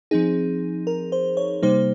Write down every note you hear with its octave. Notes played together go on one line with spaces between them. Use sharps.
F3 C4 D#4 G#4
A#4
C5
C#5
C3 G3 A#3 D#4 C5